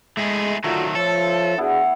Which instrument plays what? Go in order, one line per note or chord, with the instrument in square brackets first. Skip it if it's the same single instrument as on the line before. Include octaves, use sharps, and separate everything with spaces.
[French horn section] G#3 [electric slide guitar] A3 E4 G#4
[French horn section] D3 F4 F#4 [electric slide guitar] D#3 F#3 [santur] A3
[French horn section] F3 C#5 [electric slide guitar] A4
[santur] B3 E4 [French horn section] D4 F#4 G#4